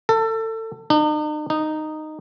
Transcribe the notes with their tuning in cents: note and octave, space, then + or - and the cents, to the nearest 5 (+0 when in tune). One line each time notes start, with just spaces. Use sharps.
A4 +25
D#4 -45
D#4 -10